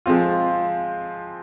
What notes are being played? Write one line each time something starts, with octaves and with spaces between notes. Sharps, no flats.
F3 G#3 C4 F4